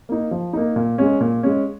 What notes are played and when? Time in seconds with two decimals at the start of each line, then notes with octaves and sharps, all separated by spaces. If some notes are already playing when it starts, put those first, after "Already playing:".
0.09 A#3 D#4
0.31 F3
0.53 A#3 D#4
0.76 A#2
0.98 G#3 C#4
1.20 A#2
1.43 G#3 C#4